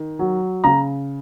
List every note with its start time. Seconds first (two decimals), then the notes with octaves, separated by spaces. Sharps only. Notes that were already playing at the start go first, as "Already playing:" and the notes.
Already playing: D#3
0.19 F#3
0.64 C#3 A#5